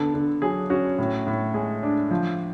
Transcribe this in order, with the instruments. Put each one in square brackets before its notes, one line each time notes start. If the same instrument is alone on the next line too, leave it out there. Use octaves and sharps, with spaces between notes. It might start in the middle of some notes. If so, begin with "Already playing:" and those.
Already playing: [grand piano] D3 B3 A4
D3
F#3 G#4
C#4 F#4
A2
A2
G#3 G#4
D4
F3